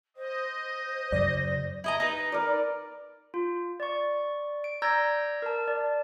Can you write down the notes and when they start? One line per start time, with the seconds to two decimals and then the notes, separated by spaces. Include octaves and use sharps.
0.17 C5 D#5
1.12 F#2 C#3 D5 A#6
1.84 E4 D#5 A#5
2.00 D#4 B4
2.32 A#4 D5
3.34 F4
3.80 D5 C#6
4.64 D7
4.82 D5 A#5 E6 G6 G#6 A#6
5.42 A#4 A5
5.68 D5